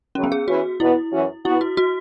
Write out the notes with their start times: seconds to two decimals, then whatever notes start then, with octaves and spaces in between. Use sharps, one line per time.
0.15 F#2 C#3 F#3 C#4
0.24 B3
0.32 G#4
0.48 E3 C#4 E4 F#4 C#5
0.80 E2 B2 B3 E4
1.12 F#2 E3 C#4 F#4
1.45 B2 B3 E4 F#4
1.61 F#4
1.77 F#4